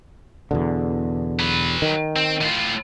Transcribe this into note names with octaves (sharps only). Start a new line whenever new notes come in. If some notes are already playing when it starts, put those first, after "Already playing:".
E2 B2 D3
F#3 B4
D#3
C4
A2 F4